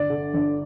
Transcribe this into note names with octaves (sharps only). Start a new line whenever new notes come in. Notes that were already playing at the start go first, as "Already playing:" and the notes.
Already playing: G1 D5
D3
G1